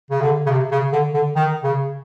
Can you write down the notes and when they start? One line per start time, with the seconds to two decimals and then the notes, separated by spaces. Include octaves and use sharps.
0.10 C#3
0.21 D3
0.46 C#3
0.50 C3
0.71 C#3
0.92 D3
1.14 D3
1.36 D#3
1.63 C#3